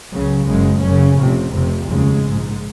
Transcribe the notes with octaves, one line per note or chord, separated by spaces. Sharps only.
C#2 C#3 F#3
F#1 F#2 C#3 G#3
F#1 F#2 C#3 C#4
F1 F2 C3
F1 F2 C3
F1 D#2 C#3 G#3
A#1 G#2